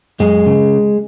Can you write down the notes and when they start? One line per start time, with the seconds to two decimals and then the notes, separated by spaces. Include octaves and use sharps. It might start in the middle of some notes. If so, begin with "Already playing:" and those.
0.20 F#2 G#3
0.46 C#3